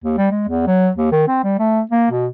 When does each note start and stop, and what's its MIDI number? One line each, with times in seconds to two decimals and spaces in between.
0.04 0.17 39
0.18 0.30 55
0.31 0.47 56
0.48 0.64 40
0.67 0.89 54
0.97 1.12 39
1.12 1.24 51
1.28 1.39 60
1.44 1.55 55
1.59 1.81 57
1.92 2.09 58
2.11 2.27 47